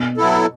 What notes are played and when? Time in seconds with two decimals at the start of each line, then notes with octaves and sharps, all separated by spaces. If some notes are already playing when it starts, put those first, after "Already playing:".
Already playing: B2
0.17 F#3 B3 E4 A4